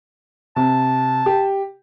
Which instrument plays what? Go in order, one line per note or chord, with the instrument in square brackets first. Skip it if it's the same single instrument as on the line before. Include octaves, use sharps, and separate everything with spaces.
[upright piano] C3 [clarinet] A5
[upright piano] G4